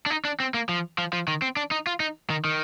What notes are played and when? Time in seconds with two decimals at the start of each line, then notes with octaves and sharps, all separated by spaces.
0.06 D4
0.10 D#4
0.25 D4
0.40 C4
0.54 A#3
0.69 F3
0.98 F3
1.13 F3
1.28 D#3
1.42 C4
1.56 D4
1.71 D#4
1.87 F4
2.00 D#4
2.30 D#3
2.45 D#3